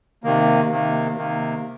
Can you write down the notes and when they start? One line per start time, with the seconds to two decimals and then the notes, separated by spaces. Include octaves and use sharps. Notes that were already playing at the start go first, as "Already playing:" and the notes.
0.23 C3 D#3 A#3
0.70 C3 D#3 A#3
1.17 C3 D#3 A#3